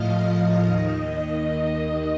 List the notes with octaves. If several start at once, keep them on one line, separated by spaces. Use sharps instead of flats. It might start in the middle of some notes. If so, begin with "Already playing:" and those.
Already playing: A2 F3 D#5 F5
D#5
D#2 D#3
D#5